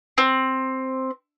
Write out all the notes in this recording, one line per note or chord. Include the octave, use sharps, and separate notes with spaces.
C4